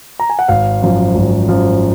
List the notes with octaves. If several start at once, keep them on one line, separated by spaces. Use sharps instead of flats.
A#5
G#5
F#5
G#1 F5
F#2 F3
G#1
F#2 F3